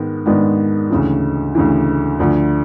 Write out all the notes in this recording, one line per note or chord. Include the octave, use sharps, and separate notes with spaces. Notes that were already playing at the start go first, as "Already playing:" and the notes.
Already playing: G#2 D#3 G#3 B3
G#2 D#3 G#3 B3 D4
D2 C#3 E3
D2 C#3 E3
D2 D3 F3